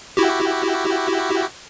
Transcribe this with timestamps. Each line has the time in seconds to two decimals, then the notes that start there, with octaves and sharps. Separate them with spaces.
0.17 E4 F#4 G4